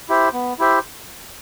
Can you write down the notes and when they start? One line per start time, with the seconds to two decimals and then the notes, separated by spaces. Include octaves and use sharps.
0.09 E4 G4 C5 E5
0.34 B3
0.59 E4 G4 C5 E5